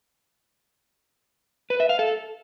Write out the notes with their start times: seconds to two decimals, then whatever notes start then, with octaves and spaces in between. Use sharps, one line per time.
1.70 B4
1.80 E5
1.89 F5
1.99 A4